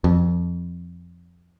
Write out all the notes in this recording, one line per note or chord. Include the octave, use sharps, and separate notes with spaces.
F2